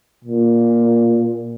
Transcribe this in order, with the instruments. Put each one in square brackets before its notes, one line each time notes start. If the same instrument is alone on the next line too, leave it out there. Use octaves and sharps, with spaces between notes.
[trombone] A#2